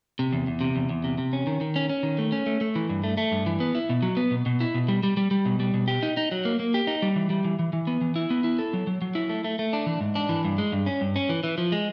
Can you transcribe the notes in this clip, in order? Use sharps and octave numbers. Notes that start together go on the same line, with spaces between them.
C3
E2
E2
C3
E2
E2
C3
C3
C#4
D#3
D#3
C#4
C#4
D#3
A3
C#4
A3
A3
E3
G2
A3
A3
G2
E3
B3
E4
B2
F#3
B3
B2
B2
E4
B2
G3
G3
G3
G3
B2
G3
B2
G4
D#4
D#4
F#3
A#3
A#3
G4
D#4
G3
E3
G3
E3
E3
E3
B3
E3
E4
B3
E4
A4
F#3
F#3
F#3
E4
A3
A3
A3
D4
E3
G#2
D4
E3
G2
G#3
G2
C#4
G2
C#4
E3
E3
F3
G#3